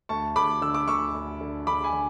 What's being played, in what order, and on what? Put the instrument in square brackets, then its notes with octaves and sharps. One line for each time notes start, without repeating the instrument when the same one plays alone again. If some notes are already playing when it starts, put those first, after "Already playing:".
[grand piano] D2 A5 C#6
D2 B5 D6
D3 E6
D6
D2 C#6 E6
D2
D3
D3 B5 D6
G#5 B5
D3